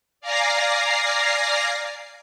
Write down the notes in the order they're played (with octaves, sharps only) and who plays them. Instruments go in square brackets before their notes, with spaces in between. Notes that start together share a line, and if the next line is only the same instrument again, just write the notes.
[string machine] D5 F5 G#5 A#5 A#6 C7